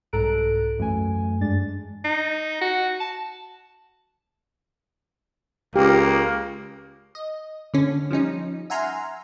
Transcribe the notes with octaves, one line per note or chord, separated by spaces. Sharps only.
C2 G#2 A4 A#5 F#6 D7
F#2 E3 A3 G#5
G2 G#3 D4 A6
D#4
F#4
A5
C#2 A#3 G4
D#5
D3 C#4
F3 G3 C#4 D#4
E5 F#5 G#5 A#5 C6 F6